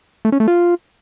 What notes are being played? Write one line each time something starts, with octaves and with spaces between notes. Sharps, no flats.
A3
C#4
A3
F4